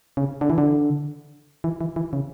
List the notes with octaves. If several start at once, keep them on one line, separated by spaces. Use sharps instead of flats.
C#3
D3
E3
D3
E3
E3
E3
C#3